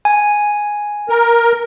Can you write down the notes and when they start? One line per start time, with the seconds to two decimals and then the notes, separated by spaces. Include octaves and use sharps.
0.05 G#5
1.09 A#4